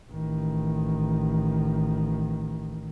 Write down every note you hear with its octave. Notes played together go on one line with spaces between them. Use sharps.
A1 D#3